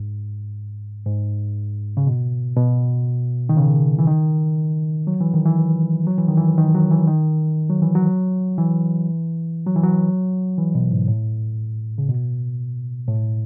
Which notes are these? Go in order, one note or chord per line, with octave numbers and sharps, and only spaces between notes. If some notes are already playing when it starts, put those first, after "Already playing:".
Already playing: G#2
G#2
C#3
B2
B2
D#3
C#3
E3
D#3
F#3
E3
D#3
E3
F#3
E3
D#3
E3
D#3
F#3
E3
D#3
F#3
E3
F#3
E3
F#3
E3
F#3
E3
B2
G#2
A2
C#3
B2
A2